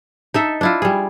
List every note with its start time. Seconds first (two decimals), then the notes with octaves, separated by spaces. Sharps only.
0.34 D#4 A4 E5
0.61 D4 E4 F4
0.82 G3 G#4